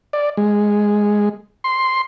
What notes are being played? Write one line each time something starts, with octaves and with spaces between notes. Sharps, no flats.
D5
G#3
C6